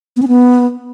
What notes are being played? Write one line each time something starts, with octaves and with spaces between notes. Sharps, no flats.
B3
C#4
B3